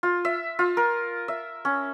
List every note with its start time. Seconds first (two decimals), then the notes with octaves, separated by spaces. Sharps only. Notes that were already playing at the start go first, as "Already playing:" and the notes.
0.03 F4
0.25 E5
0.59 F4
0.77 A#4
1.28 E5
1.65 C#4